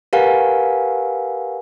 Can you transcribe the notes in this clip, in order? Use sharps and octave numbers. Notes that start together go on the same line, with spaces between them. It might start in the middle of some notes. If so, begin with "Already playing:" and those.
G4 A#4 B4 F5 F#5 G#5